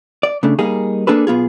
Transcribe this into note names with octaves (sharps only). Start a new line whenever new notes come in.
D5
C#3 A3 D4
G3 A#3 D#4 G#4
A#3 D4 G#4 A4 B4
B1 B3 F4 G#4